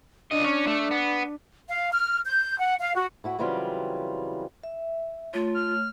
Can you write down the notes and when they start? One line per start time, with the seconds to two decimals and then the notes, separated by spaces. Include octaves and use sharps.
0.31 C#2 D4 D#5
0.44 C#4
0.67 A3
0.91 B3
1.68 F5
1.91 F6
2.26 G6
2.60 F#5
2.80 F5
2.95 F#4
3.24 A2 E4 F#4
3.39 C#3 E3 F#3 G3 C4 F4
4.64 E5
5.34 A3 F4 C#5
5.54 F6